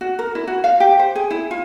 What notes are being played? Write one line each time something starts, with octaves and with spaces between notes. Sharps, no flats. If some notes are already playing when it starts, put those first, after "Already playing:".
F#4
A#4
E4
F#4
F5
G4
C5
G#4
E4
F4